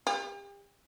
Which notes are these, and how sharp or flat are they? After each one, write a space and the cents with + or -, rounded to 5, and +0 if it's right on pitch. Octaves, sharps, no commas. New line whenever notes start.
G4 +40